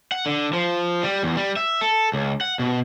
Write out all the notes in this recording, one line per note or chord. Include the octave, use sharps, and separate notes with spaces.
F#5
D3
F3
G3
E2
G3
E5
A4
C#2
F#5
B2